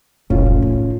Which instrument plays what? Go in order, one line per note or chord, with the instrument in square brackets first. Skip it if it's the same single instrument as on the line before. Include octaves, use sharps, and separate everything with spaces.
[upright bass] F1 C2 [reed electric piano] A2 C#4 F4
[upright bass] A1
D#3